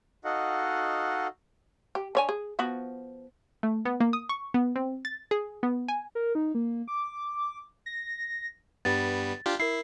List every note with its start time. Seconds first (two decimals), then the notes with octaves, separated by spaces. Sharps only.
0.25 D#4 F#4 A4 D#5 F5 F#5
1.95 G4
2.15 D3 C#5 G#5
2.29 G#4
2.59 F3 B3 F#4
3.63 A3
3.85 B3
4.00 A#3
4.13 D#6
4.29 C#6
4.54 B3
4.76 C4
5.05 A6
5.31 G#4
5.63 B3
5.88 G#5
6.15 A#4
6.35 D#4
6.55 A#3
6.88 D6
7.86 A#6
8.85 G2 G3 B3 A6
9.46 D4 F4 G4
9.60 E4 A#4 C7